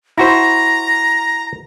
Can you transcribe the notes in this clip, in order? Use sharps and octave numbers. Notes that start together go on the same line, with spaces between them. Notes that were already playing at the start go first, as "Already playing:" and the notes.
E4 F#4 C5 A#5